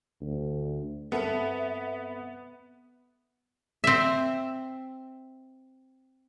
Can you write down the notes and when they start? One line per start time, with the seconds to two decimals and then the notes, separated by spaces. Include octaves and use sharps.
0.21 D2
1.12 G2 B3 C4 A4 E5
3.84 C4 E5